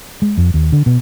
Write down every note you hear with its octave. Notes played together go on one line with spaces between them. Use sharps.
G#3
F2
D#2
D3
B2